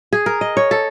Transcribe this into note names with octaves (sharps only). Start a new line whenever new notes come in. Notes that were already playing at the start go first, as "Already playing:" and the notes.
G#4
A#4
D#5
C#5
A4